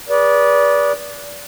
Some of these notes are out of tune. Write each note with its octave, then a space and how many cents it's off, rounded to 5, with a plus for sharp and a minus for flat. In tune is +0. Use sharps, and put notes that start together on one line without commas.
G#4 -30 B4 -25 D5 -20